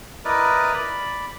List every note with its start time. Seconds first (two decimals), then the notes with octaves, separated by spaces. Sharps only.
0.25 E4 A#4 B4 D5 D#5
0.74 D5 B5